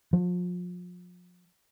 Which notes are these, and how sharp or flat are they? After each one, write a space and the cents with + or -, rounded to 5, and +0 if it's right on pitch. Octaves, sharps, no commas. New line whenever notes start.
F3 +35